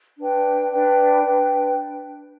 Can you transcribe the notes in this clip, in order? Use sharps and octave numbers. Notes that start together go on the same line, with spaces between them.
D4 B4 G5
D4 B4 G5
D4 B4 G5